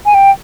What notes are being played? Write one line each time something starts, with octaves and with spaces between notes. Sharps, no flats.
G#5
G5